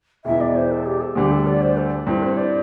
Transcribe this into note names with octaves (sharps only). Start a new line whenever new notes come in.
E1 E2 E3 E5
D5
C5
A4
G4
A4
D2 D3 G3 G4
A4
D5
C5
A4
G2 G3 C4 E4 A4
C5
D5